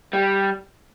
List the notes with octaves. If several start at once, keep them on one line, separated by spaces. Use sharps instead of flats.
G3